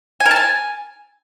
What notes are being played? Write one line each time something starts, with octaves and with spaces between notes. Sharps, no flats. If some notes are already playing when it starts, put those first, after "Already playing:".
G#5
A#4
A5
G#5